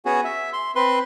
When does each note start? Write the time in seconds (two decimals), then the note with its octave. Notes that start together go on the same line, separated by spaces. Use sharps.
0.05 B3 C#4 F#4 G#4
0.24 E5
0.53 C6
0.75 C4 B4 C6